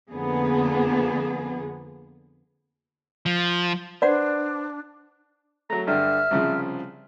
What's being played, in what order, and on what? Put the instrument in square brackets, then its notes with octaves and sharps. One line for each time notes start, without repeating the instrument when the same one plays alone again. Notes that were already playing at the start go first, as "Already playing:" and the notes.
[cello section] F2 D3 A#3 B3 G#4
[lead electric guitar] F3
[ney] D4 [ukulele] B4 C5 [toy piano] D5 F#5
[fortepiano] F#3 A3 [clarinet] A#5
[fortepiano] G2 D3 [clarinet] E5 [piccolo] F6
[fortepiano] C2 C#3 F3